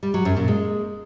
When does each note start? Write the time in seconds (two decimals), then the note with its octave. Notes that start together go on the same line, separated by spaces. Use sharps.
0.03 G3
0.14 F#3
0.25 F#2
0.37 A#2
0.48 G#3